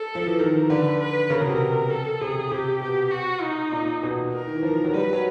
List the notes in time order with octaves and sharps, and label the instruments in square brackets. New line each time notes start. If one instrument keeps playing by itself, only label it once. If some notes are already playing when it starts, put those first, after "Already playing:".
Already playing: [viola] A4
[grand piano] F3
E3
[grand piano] D#3 [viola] A#4
[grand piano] D3 [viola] B4
[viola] B4
[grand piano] C#3 [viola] A#4
[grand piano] B2
C3
[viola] A4
[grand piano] C3 [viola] G#4
[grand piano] C3 [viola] G4
[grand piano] B2 [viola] G4
[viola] F#4
D#4
[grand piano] A#2
B2
[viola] A#4
[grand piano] D#3
E3
F3
F#3
[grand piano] G3 [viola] B4
[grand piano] F#3